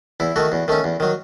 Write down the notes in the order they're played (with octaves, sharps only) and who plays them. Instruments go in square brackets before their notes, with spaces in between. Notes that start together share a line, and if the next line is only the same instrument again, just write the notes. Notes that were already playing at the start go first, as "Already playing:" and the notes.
[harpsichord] E2 E4
D#3 A3 F#4
E2
D#3 A3 C#4
E2
D#3 F#3